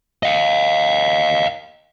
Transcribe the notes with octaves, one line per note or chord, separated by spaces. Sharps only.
D#5 F5